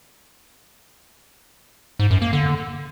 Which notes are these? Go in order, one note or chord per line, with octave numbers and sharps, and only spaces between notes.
G#2
F#2
A#3
D3